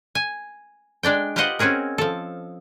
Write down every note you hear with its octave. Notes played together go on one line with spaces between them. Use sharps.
G#5
G#3 D4 D5 G5
F4 G4 B4 C5 D#5 F#5
C4 C#4 F#4 G#4 A#4
F3 A4